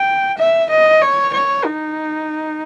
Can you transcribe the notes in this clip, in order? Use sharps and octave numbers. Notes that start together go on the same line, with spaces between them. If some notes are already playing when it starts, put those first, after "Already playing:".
Already playing: G5
E5
D#5
C#5
C#5
D#4